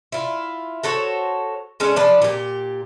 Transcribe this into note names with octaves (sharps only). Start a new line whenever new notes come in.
E4 F4
F#4 A4 C5 C#5
G#3 A3 C#4 D4
F3 D4 B4 D5
A#2 G4